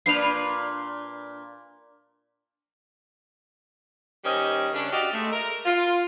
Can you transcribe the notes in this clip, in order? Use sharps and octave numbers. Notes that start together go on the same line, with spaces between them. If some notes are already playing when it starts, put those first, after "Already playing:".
A#2 D4 B4 C7 F7
D#3 G3 C#4 C5 D#5
C#3 C#4 D4
F#4 G4 D5 D#5 F5
G#3 A3
A#4
F4